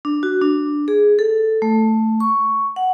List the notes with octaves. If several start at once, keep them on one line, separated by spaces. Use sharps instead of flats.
D4
F#4
D4
G#4
A4
A3
C#6
F#5